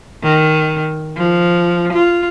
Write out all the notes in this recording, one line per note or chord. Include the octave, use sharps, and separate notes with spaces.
D#3
F3
F4